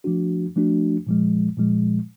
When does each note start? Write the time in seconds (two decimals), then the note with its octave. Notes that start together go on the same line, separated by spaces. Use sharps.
0.04 F3 A3 D4 F#4
0.56 F3 A3 D4 F#4
1.07 A#2 F3 G#3
1.57 A#2 F3 G#3